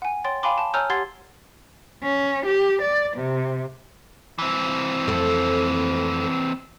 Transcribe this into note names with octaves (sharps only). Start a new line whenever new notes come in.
F#5 G#5
C#5 G5 C6 A6
F5 G5 G#5 B5 C6 D6
A5
C#5 G#5 A#5 E6 F6 G6
G4 F#5 C6 G#6 A6 C7
C#4
G4
D5
C3
E3 C4
F2 A3